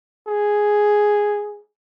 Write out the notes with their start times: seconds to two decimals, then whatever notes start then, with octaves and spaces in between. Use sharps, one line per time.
0.27 G#4